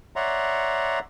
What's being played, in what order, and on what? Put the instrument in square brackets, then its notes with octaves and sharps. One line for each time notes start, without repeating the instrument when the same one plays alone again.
[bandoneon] C#5 D5 E5 F#5 A#5 C6